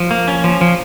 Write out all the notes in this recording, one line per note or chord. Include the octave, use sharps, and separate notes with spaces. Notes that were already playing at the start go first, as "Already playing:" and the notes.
Already playing: F3
A#3
C#4
F3
F3